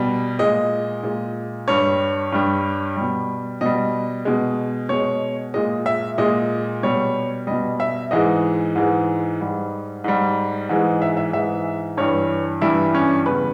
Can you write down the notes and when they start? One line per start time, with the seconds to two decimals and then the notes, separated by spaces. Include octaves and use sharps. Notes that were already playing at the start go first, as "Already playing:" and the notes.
Already playing: B2 G3
0.39 A#2 G#3 D#5
1.03 A#2 G#3
1.68 G2 G3 C#5
2.32 G2 G3
2.97 B2 G3
3.61 B2 G3 D#5
4.25 B2 G#3
4.89 B2 G#3 C#5
5.54 A#2 G#3 D#5
5.86 E5
6.18 A#2 G#3 D#5
6.83 B2 G3 C#5
7.47 B2 G3 D#5
7.80 E5
8.11 G#2 E3 G#3 D#5
8.75 G#2 E3 G#3
9.41 G#2 G3
10.04 G#2 G3
10.69 G#2 E3 G#3
11.02 E5
11.17 E5
11.33 G#2 E3 G#3 E5
11.97 G2 E3 G3 C#5
12.61 G2 E3 G3 E4
12.95 C#4
13.26 E2 C#3 G3 B4